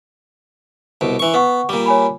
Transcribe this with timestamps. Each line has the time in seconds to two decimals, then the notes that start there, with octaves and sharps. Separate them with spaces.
1.01 C2 B2
1.19 E3 C#6
1.34 B3 B4 F#5 C#6
1.69 A#2 G3 D6
1.86 C#5 G#5 B5